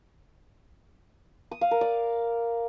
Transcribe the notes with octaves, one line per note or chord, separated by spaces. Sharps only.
D#6
F5
A#4
D5